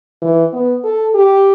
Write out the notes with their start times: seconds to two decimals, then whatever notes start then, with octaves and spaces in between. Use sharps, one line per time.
0.22 E3
0.53 B3
0.84 A4
1.15 G4